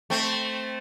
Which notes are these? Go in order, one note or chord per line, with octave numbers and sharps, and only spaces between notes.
A3 C4